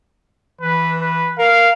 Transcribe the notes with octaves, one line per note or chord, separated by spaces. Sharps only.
E3 B4
B4
A#4 F5